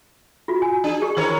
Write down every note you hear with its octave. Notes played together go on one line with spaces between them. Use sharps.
F4 F#4
G#5
D4 G#4
G4
D#3 A#4 C#5